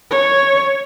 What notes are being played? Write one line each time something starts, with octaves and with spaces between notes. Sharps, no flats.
C#5